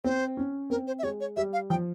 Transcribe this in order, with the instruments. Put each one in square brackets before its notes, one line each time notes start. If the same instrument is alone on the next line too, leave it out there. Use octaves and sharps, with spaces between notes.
[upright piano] C4 [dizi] C5
[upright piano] C#4
[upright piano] C4 [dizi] A#4
[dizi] C5
E5
[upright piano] G#3 [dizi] C#5
[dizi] C#5
[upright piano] G3 [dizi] E5
[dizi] F5
[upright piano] F3 [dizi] G5